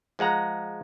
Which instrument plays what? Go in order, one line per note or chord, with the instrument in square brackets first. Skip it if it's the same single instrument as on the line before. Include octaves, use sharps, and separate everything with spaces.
[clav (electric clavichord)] F3 G#3 F#5 A#5